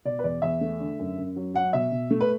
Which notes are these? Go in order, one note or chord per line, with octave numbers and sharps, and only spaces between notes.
B2 D5
B4
E2 D5
E2 E5
A3
D3
F#2
F#2
F#3
F#3 F#5
B2 E5
B2
A3
B4